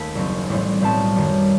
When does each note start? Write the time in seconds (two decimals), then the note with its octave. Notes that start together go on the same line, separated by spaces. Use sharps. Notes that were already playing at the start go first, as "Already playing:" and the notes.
Already playing: D#2 A3 A5 B5
0.15 F#1 F#2 F#3 C4
0.49 A1 A2 G3 C4
0.80 B1 A2 G3 C4 A5
1.16 F#2 D#3 G3